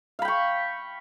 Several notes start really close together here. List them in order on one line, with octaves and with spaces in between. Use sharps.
F5 B5 G5 C#6